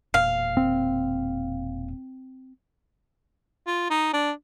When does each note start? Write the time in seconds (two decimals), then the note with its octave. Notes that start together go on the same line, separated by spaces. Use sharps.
0.14 E1 A#2 F5
0.57 C4
3.67 F4
3.90 D#4
4.13 D4